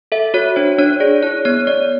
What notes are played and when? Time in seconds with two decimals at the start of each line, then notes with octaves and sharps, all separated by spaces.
0.12 A4 E5
0.34 F#4 C#5
0.56 D4 C5
0.79 D4 C#5
1.00 G#4 D5
1.23 E4 C#5
1.45 B3 C#5
1.67 B3 D5